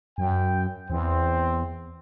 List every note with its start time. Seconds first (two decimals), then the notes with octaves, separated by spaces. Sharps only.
0.18 F#2 G5
0.90 E2 C4